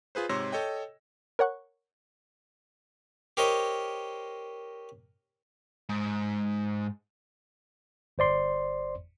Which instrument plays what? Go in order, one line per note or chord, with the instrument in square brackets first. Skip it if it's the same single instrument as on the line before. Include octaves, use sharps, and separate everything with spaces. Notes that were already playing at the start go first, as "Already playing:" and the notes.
[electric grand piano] F4 G#4 B4 C5
G#2 C3 C#5 C6 E6 A#6
A4 C#5 D#5 G5
[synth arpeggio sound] A#4 C#5 F#5 C#6 F#6
[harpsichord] G4 A#4 C5 C#5 D#5
[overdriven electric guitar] G#2
[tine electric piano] G1 C5 D5 C6